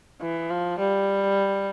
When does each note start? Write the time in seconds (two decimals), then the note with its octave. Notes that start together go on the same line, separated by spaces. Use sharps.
0.21 E3
0.50 F3
0.79 G3